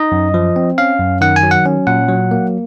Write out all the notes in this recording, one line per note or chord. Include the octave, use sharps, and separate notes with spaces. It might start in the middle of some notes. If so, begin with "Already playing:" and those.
Already playing: D#4 D#5
F#2
F3
C4
C#4 F5
F#2
D#3 F#5
G#5
F#3
F#5
C#4
A#2 F#5
F#3
A#3